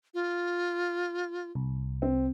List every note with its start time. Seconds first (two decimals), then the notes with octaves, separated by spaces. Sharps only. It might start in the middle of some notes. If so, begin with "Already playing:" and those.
0.14 F4
1.55 C2
2.02 C4